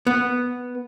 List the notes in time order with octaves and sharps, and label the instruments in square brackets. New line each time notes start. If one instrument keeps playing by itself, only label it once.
[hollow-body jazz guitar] B3